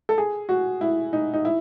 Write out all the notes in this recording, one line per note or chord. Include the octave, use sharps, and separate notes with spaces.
A4
G#4
F#4
E4
D#4
D#4
E4